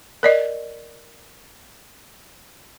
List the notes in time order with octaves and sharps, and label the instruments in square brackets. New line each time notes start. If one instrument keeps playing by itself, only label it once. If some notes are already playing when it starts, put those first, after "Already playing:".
[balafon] A#4 D5 D#5